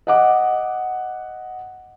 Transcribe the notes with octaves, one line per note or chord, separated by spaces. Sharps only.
D#5 F#5 D6